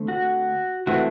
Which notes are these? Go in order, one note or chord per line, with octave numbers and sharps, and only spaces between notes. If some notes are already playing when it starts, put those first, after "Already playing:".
Already playing: D3 A3 C4
F#4
E3 A3 C4 F#4